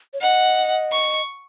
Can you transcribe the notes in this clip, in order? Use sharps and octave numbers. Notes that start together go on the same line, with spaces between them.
C#5
D#5 F#5
C#6